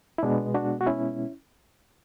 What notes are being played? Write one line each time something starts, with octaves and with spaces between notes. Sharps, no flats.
E4
B2 G#3 B3 D4
D4 F#4
F#4
C#4 E4